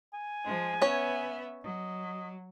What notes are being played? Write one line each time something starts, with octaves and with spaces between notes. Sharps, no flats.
G#5
F3 G#3
B3 C#4 C#5 E5
F#3 D#5